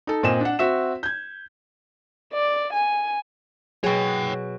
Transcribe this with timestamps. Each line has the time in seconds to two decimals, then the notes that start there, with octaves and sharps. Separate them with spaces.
0.07 D#4 A4
0.23 A#2 C4 D#5 G#5 E7
0.41 D4 F#5
0.59 C4 F#4 E5 E7
1.03 G6 G#6
2.34 D5
2.73 G#5
3.84 B2 F#3 G#4 C#5 G5